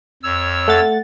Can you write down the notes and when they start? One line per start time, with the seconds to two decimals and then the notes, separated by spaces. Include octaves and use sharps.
0.23 F2 C#5 E6
0.68 A3 F#5 A6